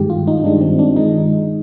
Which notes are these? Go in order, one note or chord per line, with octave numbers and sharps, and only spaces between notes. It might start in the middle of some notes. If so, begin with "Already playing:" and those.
Already playing: G2 D#3 G#3 G4
F4
D#4
D#4
G2 D#3 G#3 D4
C4
D4
D#3 G#3 D#4